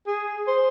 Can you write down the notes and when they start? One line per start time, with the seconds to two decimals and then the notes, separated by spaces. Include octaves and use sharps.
0.07 G#4
0.47 C5